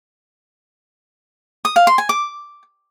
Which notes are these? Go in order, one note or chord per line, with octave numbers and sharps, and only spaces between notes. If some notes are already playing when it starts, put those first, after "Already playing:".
D#6
F5
C6
G#5
D6